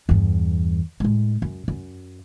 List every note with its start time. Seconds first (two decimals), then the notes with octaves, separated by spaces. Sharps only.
0.09 E2 G2
1.00 A2 G#3
1.42 F#2
1.68 F#2